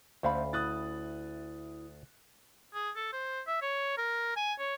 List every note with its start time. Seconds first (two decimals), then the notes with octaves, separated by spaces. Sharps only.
0.23 D2 A3 C#4 C5 F5 B5
0.53 E4 D#6 F#6 A6
2.74 G#4
2.96 A4
3.13 C5
3.47 E5
3.62 C#5
3.97 A#4
4.36 G#5
4.59 C#5